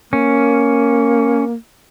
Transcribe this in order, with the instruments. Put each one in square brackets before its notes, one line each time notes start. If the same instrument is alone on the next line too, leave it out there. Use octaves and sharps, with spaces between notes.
[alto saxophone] A#3 [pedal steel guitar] C#4